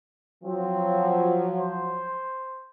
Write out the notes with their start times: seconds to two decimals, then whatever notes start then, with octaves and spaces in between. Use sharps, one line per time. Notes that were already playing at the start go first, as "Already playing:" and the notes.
0.44 F3 F#3 C4
1.58 C5